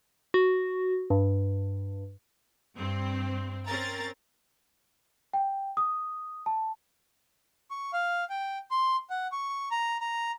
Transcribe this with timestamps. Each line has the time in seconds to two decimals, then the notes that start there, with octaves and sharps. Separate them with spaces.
0.34 F#4
1.10 G2
2.79 G2 C4
3.67 C4 C#4 A#4 A#5 A6
5.33 G5
5.77 D#6
6.46 A5
7.71 C#6
7.93 F5
8.30 G5
8.71 C6
9.10 F#5
9.32 C#6
9.71 A#5
10.00 A#5